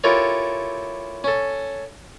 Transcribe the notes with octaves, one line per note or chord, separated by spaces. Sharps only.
E4 F4 G4 A4 A#4 C#5
C#4 A4